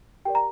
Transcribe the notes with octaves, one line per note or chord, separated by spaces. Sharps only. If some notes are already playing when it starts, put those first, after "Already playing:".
G4 A#4 D5 G5
A#5